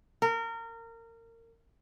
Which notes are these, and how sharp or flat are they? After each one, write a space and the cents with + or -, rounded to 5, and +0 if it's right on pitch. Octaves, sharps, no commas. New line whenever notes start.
A#4 -25